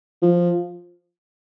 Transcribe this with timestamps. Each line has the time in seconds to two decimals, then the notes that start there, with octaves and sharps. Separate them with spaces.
0.22 F3